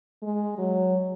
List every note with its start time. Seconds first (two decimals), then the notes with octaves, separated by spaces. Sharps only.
0.22 G#3
0.58 F#3